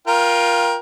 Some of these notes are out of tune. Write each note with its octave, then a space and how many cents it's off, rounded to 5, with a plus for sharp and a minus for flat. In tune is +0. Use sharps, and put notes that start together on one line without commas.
F4 +0 A#4 +25 G5 +0